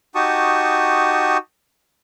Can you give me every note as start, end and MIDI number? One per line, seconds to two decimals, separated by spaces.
0.15 1.37 63
0.15 1.37 66
0.15 1.37 67
0.15 1.37 81
0.15 1.37 85
0.15 1.37 87